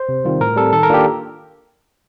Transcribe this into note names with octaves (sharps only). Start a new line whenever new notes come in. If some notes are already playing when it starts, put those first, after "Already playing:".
Already playing: C5
C3
D#3 G3 C4 F4
A2 A#4
G3 C4 A4
D#3 A4
A#4
A#3 D4 F4 G4